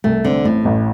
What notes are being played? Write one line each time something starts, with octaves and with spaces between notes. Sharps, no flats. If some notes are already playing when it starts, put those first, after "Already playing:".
C2 A3
D3 C4
A1 A2
A1